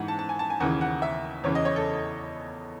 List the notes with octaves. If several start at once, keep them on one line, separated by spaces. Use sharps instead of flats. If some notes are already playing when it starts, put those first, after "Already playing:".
Already playing: G#2 E3 F#5
A5
A5
G#5
A5
G#5
D#2 C#3 E3 F#5
F#5
E5
E2 C#3 E3 C#5
D#5
C#5
A4